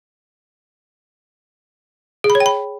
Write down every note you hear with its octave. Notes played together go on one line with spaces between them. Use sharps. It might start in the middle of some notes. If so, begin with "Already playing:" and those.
G#4
B5
C#5
G5
B5